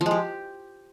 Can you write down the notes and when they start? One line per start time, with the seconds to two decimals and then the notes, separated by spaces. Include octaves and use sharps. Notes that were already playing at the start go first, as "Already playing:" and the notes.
0.01 F3
0.06 G#3
0.11 G4